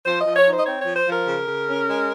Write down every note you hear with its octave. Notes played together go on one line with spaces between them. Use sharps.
F3 C5
D#5
F3
C#5
D#4 C5
D#5
C4 C#5
F3 C#5
C5
F3
A#4
C#3
C#3
C#4
G#3